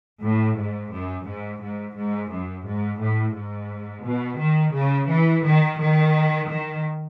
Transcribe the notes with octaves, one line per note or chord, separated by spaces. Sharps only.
A2
G#2
F#2
G#2
G#2
G#2
F#2
G#2
A2
G#2
B2
D#3
C#3
E3
D#3
D#3
D#3